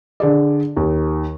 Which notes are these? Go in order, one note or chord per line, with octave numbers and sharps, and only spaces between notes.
D3 G#4 D5
D#2